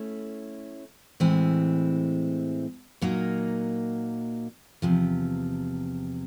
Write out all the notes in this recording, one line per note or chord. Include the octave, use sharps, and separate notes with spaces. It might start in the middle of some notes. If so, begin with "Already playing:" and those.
Already playing: A3 C#4 E4
A2 E3 G#3 C4
A#2 F#3 A#3 D#4
E2 C3 F3